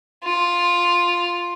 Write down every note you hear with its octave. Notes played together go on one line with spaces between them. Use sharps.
F4